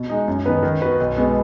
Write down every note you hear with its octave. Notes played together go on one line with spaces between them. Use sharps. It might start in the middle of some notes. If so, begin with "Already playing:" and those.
Already playing: B2
G#3 D#4
F#2
D#3 B3 D#4 B4
D#3
B3 F#4 B4
B1
B2 G#3 B3